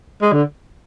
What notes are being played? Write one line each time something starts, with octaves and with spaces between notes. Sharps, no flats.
G#3
D3